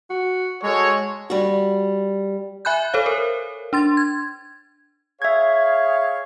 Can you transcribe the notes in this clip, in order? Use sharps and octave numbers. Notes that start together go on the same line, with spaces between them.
F#4
G#3 F#4 A4 C#5
G3 F#4
E5 G#5 B5 F#6 G6
A4 C5 C#5 F5
A#4
D4 C6 A6
G#6
G#4 C#5 E5 F5 G#6